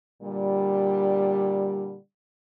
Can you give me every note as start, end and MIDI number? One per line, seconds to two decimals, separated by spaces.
0.22 1.96 46
0.22 1.96 50
0.22 1.96 55